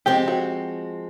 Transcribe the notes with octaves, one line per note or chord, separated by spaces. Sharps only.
F3 G#3 C4 G4
F#4